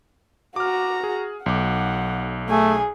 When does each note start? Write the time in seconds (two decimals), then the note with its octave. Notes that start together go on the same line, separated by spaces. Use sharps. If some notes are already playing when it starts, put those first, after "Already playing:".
0.56 F#4 A#5 D6 F6
1.04 G#4
1.46 B1 F#5 D6
2.49 A3 G#4 G#5